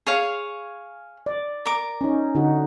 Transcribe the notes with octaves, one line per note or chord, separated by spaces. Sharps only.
G#4 C#5 F5
D5
A#4 D6
C#4 D#4
D3 D#4 F#4